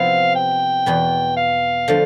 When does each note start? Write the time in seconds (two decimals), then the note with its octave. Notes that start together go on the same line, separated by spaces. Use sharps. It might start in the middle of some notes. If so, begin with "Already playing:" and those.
Already playing: C3 F3 B3 E4 F5
0.36 G5
0.86 E2 B2 B3
1.37 F5
1.88 D3 F3 A3